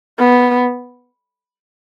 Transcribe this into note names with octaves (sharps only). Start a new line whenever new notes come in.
B3